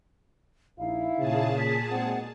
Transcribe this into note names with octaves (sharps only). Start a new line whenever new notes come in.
A#1 D#4 E4 F5
A#2 C#3 G#4 A5
B6
G#2 B2 G#3 C4 F#5